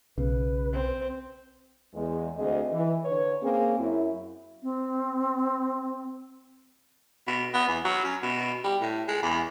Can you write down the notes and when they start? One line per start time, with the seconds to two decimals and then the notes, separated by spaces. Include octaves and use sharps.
0.18 B1 C#3 B4
0.73 C4
1.95 E2 G#3
2.37 D2 C4 G#4 D#5
2.72 E3
3.05 D3 B4 C#5
3.42 A#3 C4 C#4 G#4
3.79 F#2 E4
4.63 C4
7.27 B2
7.54 B3
7.68 E2
7.85 F#3
8.04 C#4
8.23 B2
8.64 G3
8.81 A2
9.08 G#3
9.23 E2